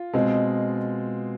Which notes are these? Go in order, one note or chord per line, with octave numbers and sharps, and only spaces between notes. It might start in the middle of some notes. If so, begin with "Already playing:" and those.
Already playing: F4
B2 G#3 C4